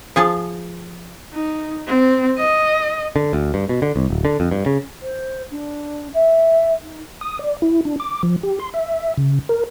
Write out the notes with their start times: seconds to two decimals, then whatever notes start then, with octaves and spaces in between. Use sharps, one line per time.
0.16 F3 G#4 A5
1.33 D#4
1.86 C4
2.38 D#5
3.16 D3
3.33 D2
3.54 G2
3.69 B2
3.82 D3
3.96 C2
4.10 D1
4.25 D3
4.40 F2
4.51 G2
4.66 C#3
5.01 C5
5.51 D4
6.14 E5
6.83 D#4
7.21 D#6
7.39 D5
7.62 E4
7.85 D4
8.00 D6
8.23 F3
8.43 G4
8.60 C6
8.74 E5
9.17 C#3
9.49 A#4